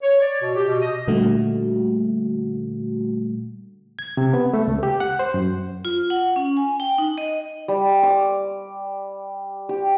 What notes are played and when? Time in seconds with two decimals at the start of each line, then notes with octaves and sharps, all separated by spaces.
0.03 C#5
0.21 D5
0.41 B2
0.55 G4
0.68 B2
0.82 D#5
1.08 A#2 D3 G3 A3 F#4
3.99 G#6
4.17 C3
4.33 B3
4.54 A3
4.68 C#2
4.83 G4
5.00 F#5
5.19 C5
5.34 F#2
5.85 F4
6.10 F#5
6.36 C#4
6.57 G#5
6.80 G5
6.98 D#4
7.18 D#5
7.68 G3
8.03 D6
9.69 G4